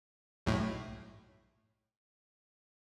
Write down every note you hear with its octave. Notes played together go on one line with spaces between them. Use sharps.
B1 A2